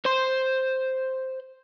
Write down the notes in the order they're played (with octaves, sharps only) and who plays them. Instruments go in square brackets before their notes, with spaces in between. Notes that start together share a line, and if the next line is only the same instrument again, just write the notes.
[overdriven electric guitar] C5 C6